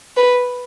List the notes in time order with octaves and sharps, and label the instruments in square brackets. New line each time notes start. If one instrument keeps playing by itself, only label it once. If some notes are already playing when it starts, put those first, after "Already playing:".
[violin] B4